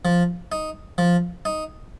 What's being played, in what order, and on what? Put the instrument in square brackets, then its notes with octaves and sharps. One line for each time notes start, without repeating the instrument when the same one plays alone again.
[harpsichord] F3
D#4
F3
D#4